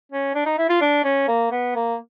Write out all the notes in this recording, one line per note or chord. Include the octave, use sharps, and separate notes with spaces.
C#4
D4
D#4
E4
F4
D4
C#4
A#3
B3
A#3